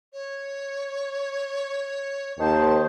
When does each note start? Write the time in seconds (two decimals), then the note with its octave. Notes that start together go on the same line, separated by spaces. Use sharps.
0.13 C#5
2.39 D#2 D#3 C5 A5